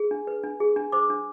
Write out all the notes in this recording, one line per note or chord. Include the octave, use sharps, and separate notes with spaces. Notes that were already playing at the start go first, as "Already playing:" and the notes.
Already playing: G#4
D4
B4
D4
G#4
D4
C5 D6
D4